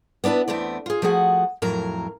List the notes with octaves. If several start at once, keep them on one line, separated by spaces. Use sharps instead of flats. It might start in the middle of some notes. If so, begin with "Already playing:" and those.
B3 D4 E4 B4 A5
E2 A3 B3 C4 D5
F4 G#4
F3 A3 F#4 G#4 F#5
F2 A2 F#3 A#4 A#5